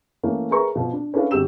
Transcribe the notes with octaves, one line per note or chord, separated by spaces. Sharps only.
E3 A3 A#3 C#4
G#4 A#4 B4 E5 A#5 C#6
B2 F3
D4
C#4 D4 E4 A4 B4 F5
G1 F#4 G4 E6 E7